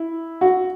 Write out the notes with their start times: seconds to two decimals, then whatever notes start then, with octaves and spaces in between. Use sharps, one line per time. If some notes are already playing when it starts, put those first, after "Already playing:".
Already playing: E4
0.41 F#4